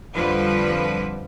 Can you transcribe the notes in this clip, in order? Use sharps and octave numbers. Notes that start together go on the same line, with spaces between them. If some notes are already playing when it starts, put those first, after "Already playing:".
F2 D3 F3 G3 B4